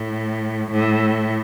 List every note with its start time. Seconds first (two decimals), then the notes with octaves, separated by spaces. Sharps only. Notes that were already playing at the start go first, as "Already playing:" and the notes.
Already playing: A2
0.71 A2